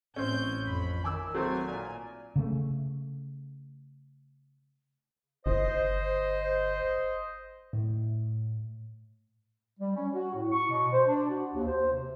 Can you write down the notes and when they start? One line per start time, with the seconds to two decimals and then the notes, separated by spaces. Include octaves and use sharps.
0.16 A1 C4 C#4 G6
0.65 F2 B5
1.04 D#3 G#5 D6 E6
1.35 F#3 A3 C4 G#5
1.68 A#2
2.36 C#3 A3
5.46 G1 C5 D#5
7.73 A2
9.80 G3
9.96 C#4
10.14 F#4
10.34 A2
10.52 C#6
10.69 B2
10.93 C5
11.07 D4
11.30 F#4
11.54 D#2
11.67 C5
11.92 C3